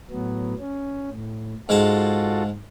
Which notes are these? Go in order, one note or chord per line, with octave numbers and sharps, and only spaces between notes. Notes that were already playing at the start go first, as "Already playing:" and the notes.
A2 F#3 B3
C#4
A2
G#2 G#3 F4 F#4 A4 A5